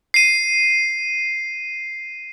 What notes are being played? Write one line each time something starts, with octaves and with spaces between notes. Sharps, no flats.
C7 D#7